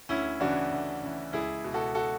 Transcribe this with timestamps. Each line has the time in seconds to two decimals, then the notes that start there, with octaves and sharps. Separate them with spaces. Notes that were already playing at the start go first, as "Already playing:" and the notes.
0.09 D2 C#4 E4
0.40 C#3 E3 D4 F#4
0.71 D2
1.03 C#3 E3
1.33 C#2 E4 G#4
1.64 B2
1.74 F#4 A4
1.95 F#4 A4